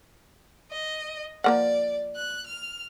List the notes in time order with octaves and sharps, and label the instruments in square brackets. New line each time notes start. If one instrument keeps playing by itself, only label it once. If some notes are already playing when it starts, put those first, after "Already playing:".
[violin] D#5
[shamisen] F3 A#3 F#5 [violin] D5
[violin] F#6
F6